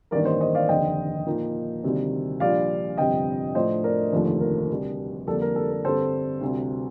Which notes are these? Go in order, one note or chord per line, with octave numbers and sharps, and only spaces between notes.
A1 G2 D#3 A#3 A#4 D5
C5 D#5
C5 D#5
D5 F5
F1 D#2 D3 D#5 G5
A#2 F3 A#3 D#4
D2 C3 D#3 G3
A#1 A#2 G3 D4 F4 D5 F5
G1 F2 C3 G3 D#5 G5
A2 F3 A3 D4 C5 D#5
A#4 D5
F1 D#2 D3 F3 A3
A#4
D2 C3 G3
F2 D3 G3 A#3 D4 A4
A#4
A4
A#4
G2 D3 G3 C4 A4 C5
D2 C3 G3